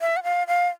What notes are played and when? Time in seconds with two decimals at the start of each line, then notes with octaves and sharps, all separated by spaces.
0.01 E5
0.17 F#5
0.23 F5
0.47 F5